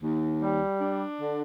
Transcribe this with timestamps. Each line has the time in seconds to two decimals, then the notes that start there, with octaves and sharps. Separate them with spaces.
0.02 D#2
0.41 G3
0.81 D4
1.20 D3